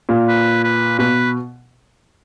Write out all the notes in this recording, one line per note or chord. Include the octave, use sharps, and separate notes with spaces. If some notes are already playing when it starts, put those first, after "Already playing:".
A#2
B4
B4
B2 B4